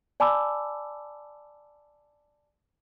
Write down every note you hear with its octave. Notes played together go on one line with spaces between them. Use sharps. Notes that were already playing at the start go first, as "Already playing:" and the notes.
D5 G#5 A5 B5 D6 E6